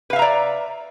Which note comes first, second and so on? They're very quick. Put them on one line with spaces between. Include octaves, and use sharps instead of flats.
B4 F5 E5 A#5 D5